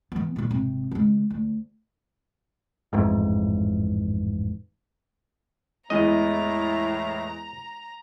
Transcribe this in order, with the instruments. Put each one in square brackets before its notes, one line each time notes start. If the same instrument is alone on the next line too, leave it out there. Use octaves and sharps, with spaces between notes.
[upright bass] E3 B3
A#2 D3
G#1 C3
C#3 G#3
D2
[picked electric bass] A1 F2 G#2
[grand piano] E2 E3 G#3 [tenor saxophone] A2 [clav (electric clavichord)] D#5 [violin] A#5